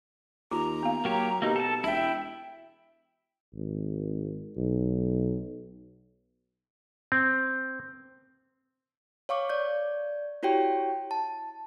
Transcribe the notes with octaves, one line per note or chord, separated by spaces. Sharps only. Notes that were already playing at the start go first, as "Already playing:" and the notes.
D#2 F4 A#5
B3 F5
F#3 A#3 G4 C#5
B2 A#3 D#4 F#4 G4
A4 A5
E1 E4 E5 G5
G#1
B1
C4
C#5 F5 C#6 D6
D5 G6
E4 F#4 G4 C#5 G5
A5